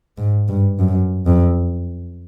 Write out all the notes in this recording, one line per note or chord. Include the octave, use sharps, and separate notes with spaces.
G#2
G2
F#2
F2